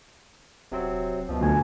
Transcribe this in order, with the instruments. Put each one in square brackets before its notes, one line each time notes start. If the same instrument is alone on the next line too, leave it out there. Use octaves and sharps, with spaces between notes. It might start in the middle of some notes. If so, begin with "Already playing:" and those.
[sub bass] D#1 [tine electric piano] C3 F#3 C4
[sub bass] C#2 [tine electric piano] F#2 B2 F3
[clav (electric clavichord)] D2 G#5